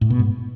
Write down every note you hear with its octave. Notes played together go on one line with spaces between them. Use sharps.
A2
B2
G#2